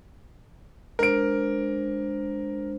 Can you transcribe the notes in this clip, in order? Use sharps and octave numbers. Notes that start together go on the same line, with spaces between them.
G#3 D4 A#4 C5 D7